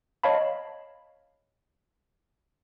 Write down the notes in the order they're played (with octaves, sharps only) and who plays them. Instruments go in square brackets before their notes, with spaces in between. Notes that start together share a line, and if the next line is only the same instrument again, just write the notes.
[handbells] C#5 D#5 F5 A5 B5